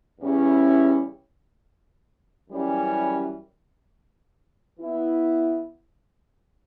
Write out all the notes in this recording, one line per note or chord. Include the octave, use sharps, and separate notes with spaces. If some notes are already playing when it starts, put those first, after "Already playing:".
E2 C#3 G3 C#4 E4
F#2 E3 G3 C#4
E3 B3 E4